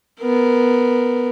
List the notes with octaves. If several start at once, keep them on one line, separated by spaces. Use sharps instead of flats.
B3 A#4